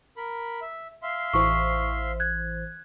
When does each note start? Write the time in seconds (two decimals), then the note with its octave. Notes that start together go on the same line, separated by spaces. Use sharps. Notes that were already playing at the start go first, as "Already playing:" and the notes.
0.17 A#4 B5
0.62 E5
1.03 E5 F5 C6
1.33 A1 E3 C5 C#6
2.20 F#6 G#6